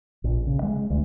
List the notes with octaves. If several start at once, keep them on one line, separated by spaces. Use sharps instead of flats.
A#1
C#3
G#3
D2